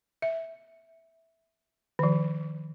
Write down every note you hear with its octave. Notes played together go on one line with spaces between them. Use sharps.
E5
D#3 F3